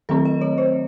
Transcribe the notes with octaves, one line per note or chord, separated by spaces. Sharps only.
D#3 F#3 A3 C4 A4
D#5
C#5
C5